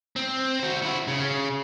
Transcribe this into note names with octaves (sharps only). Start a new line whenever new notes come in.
C4
F#4 C5
E4 F#4
C#3